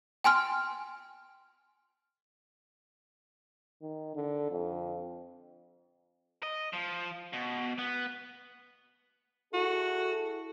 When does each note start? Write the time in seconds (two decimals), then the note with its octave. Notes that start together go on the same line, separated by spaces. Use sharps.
0.24 G5 G#5 C6 F6
3.82 D#3
4.15 D3
4.51 F2
6.43 D#5
6.73 F3
7.33 B2
7.78 B3
9.53 E4 F#4 G#4 A4